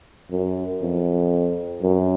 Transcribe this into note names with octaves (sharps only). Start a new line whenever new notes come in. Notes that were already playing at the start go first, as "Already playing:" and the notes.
F#2
F2
F#2